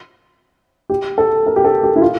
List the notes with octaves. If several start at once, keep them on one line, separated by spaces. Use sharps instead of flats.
G4
A4
A#4
G4
A4
G4
E4
F4